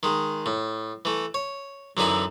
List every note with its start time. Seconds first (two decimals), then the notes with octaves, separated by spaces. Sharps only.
0.03 D#3 G#3
0.46 A2
1.05 E3 A3
1.34 C#5
1.97 F#2 D3 E3 D#4 E4